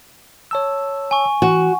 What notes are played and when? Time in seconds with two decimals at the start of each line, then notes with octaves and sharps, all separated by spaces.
0.51 C#5 A5 E6
1.11 G#5 C#6
1.42 E3 F#4